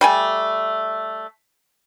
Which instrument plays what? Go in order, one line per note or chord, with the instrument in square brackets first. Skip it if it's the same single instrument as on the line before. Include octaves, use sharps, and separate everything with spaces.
[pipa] G3 A3 G#5